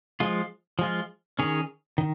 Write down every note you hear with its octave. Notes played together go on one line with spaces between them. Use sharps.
F3 G#3 F4
F3 G#3 F4
D#3 C#4 G#4 C#5
D#3